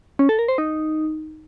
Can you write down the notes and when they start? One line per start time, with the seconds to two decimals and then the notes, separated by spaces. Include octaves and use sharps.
0.19 C#4
0.29 A4
0.39 A#4
0.48 C5
0.58 D#4